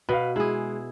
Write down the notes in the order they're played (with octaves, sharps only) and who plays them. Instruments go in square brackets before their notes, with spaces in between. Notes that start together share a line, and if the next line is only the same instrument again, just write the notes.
[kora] B2 [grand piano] B4 F5
[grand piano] G#3 [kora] E4 G#4